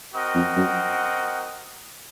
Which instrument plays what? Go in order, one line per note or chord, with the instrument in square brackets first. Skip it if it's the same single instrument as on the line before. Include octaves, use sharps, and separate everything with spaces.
[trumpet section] C4 F#4 A#4 D#5 F#5
[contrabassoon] F2
F#2